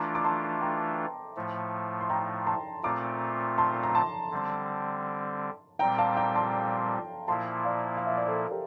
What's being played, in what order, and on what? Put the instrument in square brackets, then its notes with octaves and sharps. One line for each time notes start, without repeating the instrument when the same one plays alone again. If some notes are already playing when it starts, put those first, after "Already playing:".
Already playing: [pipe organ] E3 A3 D4 F4 [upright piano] A#5 D6
[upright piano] D6
A5 C6
G5 A#5
[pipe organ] A2 F3 A3
[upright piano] C6
G5 A#5
A5 C6
[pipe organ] A#2 A3 C4 F4 [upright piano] A#5 D6
[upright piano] A5 C6
A#5
A5 C6
[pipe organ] D3 G3 C4
[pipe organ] A#2 G3 C4 [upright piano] G5 A#5
[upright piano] F5 A5
G5 A#5
A5 C6
[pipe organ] A#2 F3 A#3 E4 [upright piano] A5 C6
[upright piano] D5 F5
F5
E5
D5
A4 C5
G4 A#4